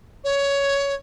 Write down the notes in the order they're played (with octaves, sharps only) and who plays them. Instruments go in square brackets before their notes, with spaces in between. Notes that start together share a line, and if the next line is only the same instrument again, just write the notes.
[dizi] C#5